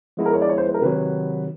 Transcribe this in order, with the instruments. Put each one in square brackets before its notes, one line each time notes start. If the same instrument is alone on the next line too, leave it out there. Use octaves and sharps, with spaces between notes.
[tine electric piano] F3 G#3 B3 E4
[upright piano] A#4
C#5
D5
C#5
C5
B4
A#4
[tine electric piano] C3 D#3 F#3 [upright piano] B4